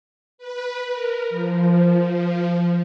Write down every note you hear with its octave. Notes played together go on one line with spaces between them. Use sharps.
B4
A#4
F3